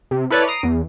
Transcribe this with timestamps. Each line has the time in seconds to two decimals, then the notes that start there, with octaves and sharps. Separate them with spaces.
0.11 C3
0.30 E4 A4 B4 C#5 D5
0.48 A#5 D#6 C7 D7
0.63 E2